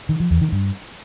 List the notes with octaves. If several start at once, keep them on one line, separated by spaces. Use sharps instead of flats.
D#3
F3
E2
D#3
G2